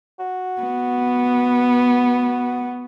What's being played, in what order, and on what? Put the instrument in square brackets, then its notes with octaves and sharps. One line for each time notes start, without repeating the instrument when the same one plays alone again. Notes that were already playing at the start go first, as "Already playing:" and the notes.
[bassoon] F#4
[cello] B3